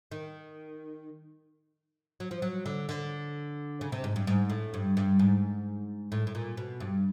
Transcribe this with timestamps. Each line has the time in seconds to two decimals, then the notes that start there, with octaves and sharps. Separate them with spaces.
0.12 D#3
2.20 F#3
2.31 F3
2.42 F#3
2.66 D3
2.89 D3
3.81 C#3
3.92 C3
4.04 G#2
4.16 G2
4.27 G#2
4.50 A2
4.74 G2
4.97 G2
5.19 G#2
6.12 A2
6.27 A2
6.35 A#2
6.57 B2
6.80 G2